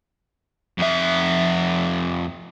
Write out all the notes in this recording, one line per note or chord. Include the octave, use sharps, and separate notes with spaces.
F2 E5